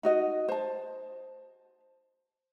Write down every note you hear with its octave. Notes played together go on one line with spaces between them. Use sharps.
D#4 F#4 D#5
C5 A5